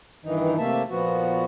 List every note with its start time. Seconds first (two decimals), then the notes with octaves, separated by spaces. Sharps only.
0.24 G2 D#3 E3 D#4
0.58 C3 A3 A#3 E5 A5
0.90 A#2 F3 B3 F#4